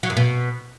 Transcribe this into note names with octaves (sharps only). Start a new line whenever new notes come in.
F#3
F#2
B2